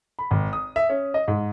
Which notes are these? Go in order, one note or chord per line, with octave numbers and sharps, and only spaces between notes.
B5
G#1
D#6
E5
C#4
D#5
G#2